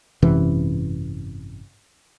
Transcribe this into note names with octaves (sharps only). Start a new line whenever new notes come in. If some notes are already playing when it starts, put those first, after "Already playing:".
G#1 F#2 C3 E3